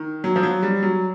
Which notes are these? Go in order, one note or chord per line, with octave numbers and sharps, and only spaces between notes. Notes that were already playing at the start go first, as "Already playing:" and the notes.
Already playing: D#3
F#3
F3
F#3
G3
F#3